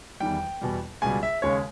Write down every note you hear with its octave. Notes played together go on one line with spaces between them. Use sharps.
E2 D#3 G3 G5
E2 B2 G3
C#2 B2 G3 G#5
E5
D#2 C#3 G#3 C#5